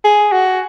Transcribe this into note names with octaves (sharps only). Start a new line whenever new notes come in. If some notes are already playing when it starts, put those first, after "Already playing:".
G#4
F#4